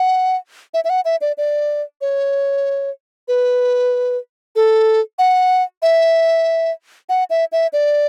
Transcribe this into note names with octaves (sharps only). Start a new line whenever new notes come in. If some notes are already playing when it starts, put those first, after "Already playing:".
Already playing: F#5
E5
E5
F#5
E5
D5
D5
C#5
B4
A4
F#5
E5
F#5
E5
E5
D5